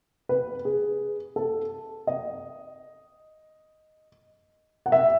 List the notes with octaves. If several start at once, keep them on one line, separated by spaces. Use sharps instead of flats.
B4
G#4
A4
D#5
F#5
E5